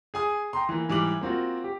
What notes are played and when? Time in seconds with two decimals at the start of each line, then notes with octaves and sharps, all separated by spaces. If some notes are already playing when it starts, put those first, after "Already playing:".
0.14 G#4 G#5 D#6
0.53 G5 A#5 C6
0.69 E3 A#3
0.89 G#2 E3 G3 D6 F#7
1.21 A#3 C4 F4 F#4
1.64 G4